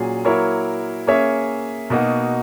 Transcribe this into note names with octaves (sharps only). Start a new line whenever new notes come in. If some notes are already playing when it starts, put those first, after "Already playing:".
Already playing: A#2 F#3 C#4 G#4
F#3 A#3 E4 A#4 C#5
A#3 C#4 G#4 C#5 E5
B2 A#3 D#4 F#4